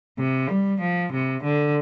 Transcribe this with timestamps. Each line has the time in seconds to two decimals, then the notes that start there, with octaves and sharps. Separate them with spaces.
0.19 C3
0.49 G3
0.81 F3
1.13 C3
1.43 D3